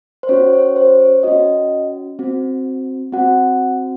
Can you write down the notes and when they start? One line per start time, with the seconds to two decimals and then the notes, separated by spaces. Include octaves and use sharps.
0.23 C5
0.29 C#4 F#4 C#5
0.53 C#5
0.76 C5
1.00 C#5
1.23 C#4 F#4 D#5
2.19 C4 F#4
3.13 C4 F#4 F#5